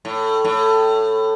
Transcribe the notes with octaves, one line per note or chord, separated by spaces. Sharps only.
A2
A2